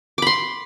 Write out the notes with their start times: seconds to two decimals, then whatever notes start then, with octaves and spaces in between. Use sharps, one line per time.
0.18 D6
0.22 B5
0.27 C6